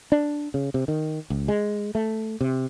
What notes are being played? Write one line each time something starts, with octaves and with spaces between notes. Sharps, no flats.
D4
C#3
C3
D#3
C#2
G#3
A3
C3